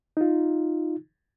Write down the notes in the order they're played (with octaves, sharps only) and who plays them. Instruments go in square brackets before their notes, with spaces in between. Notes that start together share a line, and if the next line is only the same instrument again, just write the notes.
[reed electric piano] D#4 F4